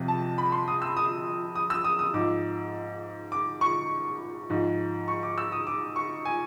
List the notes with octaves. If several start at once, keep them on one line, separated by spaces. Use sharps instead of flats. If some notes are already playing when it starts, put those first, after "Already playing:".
Already playing: F2 C3 F3
A5
B5
C6
D#6
E6
D#6
D#6
E6
D#6
D#6
G#2 F3 D6
D6
C#6
G#2 F3
C#6
D6
E6
D#6
D6
C#6
G#5